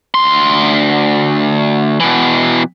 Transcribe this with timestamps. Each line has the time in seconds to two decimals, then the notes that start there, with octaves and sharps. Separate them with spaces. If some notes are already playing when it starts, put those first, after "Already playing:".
0.14 D2 C6
2.00 B2 E3